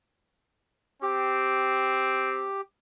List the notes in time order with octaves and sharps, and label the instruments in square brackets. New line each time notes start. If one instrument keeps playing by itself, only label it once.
[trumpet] C4 [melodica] G4